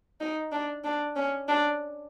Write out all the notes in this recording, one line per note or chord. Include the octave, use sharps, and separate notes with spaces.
D#4
D4
D4
C#4
D4